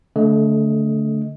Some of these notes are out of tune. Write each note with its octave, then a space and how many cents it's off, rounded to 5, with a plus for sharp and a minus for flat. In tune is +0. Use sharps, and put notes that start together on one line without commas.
D3 -25 A3 +0 D#5 +15